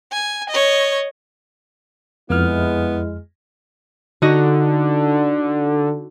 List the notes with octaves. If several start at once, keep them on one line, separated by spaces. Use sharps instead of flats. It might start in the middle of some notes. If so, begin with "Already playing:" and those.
G#5
C#5 D#5
F2 G#3 B3 E4 F6
D3 D#4 F#4 D#5